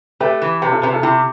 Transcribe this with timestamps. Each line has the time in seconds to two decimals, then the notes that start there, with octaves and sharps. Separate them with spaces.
0.20 A3 G4 B4
0.42 E3
0.62 C3 G4 B4
0.72 F4 A4
0.83 C3 G4 B4
0.93 F4 A4
1.03 C3 E4 G4